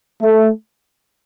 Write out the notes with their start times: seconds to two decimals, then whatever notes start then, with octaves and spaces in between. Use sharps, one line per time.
0.21 A3